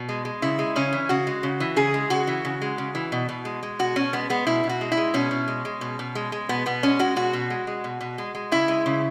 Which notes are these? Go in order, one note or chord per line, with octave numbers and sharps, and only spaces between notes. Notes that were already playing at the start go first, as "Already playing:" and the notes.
Already playing: B2
G#3
G#3
C#3 E4
G#3
C#3 C#4
E3
C#3 F#4
G#3
C#3
E3
C#3 G#4
G#3
C#3 F#4
E3
C#3
G#3
C#3
E3
B2
B2
G#3
G#3
B2 F#4
B2 C#4
G#3 B3
G#3 B3
B2 E4
B2
F#4
G#3
E4
G#3
B2 C#4
B2
G#3
G#3
B2
B2
G#3
G#3
B2 B3
B2 B3
G#3 C#4
G#3 F#4
B2 F#4
B2
G#3
G#3
B2
B2
G#3
G#3
C#3 E4
G#3
C#3